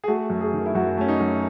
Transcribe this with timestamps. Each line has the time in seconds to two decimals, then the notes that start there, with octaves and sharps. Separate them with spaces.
0.04 G#4
0.08 A3 F#4
0.30 F#2
0.41 G#4
0.53 D#3
0.66 E4
0.75 F#2 F#4
0.98 A3 C#4
1.08 D#4
1.20 F#2